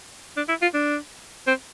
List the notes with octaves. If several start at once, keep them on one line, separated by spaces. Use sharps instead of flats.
D4
E4
F4
D4
C4